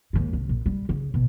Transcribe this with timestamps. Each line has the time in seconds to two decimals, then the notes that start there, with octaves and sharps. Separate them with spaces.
0.13 D#2 G#2
0.33 C2
0.49 A#1
0.66 G3
0.89 C#3
1.14 A1 B2